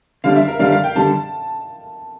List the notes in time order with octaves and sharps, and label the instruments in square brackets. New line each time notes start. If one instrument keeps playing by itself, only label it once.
[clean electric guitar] D3 G3 D4 [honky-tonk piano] F5
[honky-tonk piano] E5
A#4
[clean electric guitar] D3 G3 D4 [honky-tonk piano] F5
[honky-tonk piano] F5
G5
[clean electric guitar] D3 G3 D4 [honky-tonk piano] A5